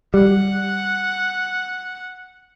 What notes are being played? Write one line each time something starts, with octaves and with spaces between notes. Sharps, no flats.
G3 F#5